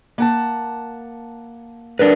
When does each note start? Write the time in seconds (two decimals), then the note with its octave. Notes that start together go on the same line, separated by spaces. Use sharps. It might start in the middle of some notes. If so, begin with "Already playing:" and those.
0.18 A#3 F#5 A5
1.99 D4 A#4 B4